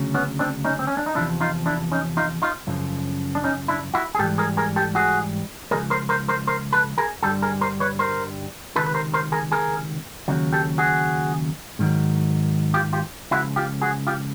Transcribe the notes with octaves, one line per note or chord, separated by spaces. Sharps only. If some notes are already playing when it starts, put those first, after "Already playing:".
Already playing: D2 C#3 F#3
B3 C#4
C4 D4
C#4 D#4
C4
C#4
D4
D#4
E2 C3 F3 D4 E4
D#4 F4
D4 E4
C#4 D#4
D#4 F4
D#4 F4
F#2 C#3 F3
D4
C#4 D#4
D4 E4
E4 F#4
G#4
G#2 E3 G3 G4 A4
G#4 A#4
G#4 A#4
G4 A4
F#4 G#4
C#2 C3 F3 G#4 A#4
A#4 C5
A#4 C5
A#4 C5
A#4 C5
A4 B4
G#4 A#4
G2 D3 G3 G4 A4
G#4 A#4
A#4 C5
B4 C#5
A#4 C5
C#2 C3 D#3 A4 B4
B4
A#4 C5
A#4 C5
G#4 A#4
G#4 A#4
D#2 C#3 F#3
G4 A4
F#4 G#4
G#2 D#3 F#3
F4 G4
F4 G4
C#2 C#3 F3 E4 F#4
F4 G4
F#4 G#4
F4 G4